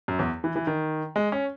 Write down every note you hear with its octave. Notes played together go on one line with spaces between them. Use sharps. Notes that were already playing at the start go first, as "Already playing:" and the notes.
F#2
E2
E3
E3
D#3
G#3
C#4